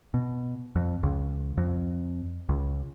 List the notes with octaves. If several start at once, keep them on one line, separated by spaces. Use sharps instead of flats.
B2
F2
C#2
F2
C#2